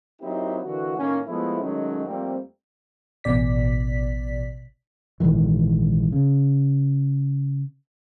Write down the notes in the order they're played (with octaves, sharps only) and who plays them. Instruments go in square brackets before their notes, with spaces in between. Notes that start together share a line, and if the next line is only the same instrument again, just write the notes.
[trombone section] F#3 A#3 C4 D#4 E4 G4
D3 E3 A#3 F#4
A2 D#3 A#3 C#4
F3 G#3 A3 B3 E4
D#3 F#3 G#3 A3 C#4
F2 G3 A3 A#3 C4
[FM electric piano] A1 B2 D5 B6
[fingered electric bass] A#1 G#2 D#3 E3
C#3